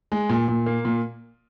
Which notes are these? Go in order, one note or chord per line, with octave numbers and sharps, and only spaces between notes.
G#3
A#2
A#2
A#3
A#2